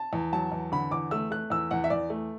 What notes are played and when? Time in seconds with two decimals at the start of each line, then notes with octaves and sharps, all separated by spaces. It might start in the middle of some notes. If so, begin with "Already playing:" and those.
Already playing: A5
0.13 E2
0.32 F#3 A5
0.52 E2
0.72 D3 B5
0.91 E2 D6
1.11 A3 E6
1.31 A3 F#6
1.50 E2 E6
1.71 E2 F#5
1.84 E5
1.90 E2 D5
2.10 A3